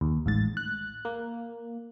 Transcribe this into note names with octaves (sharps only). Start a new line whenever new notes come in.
D#2
A1 G#2 A6
F#6
A#3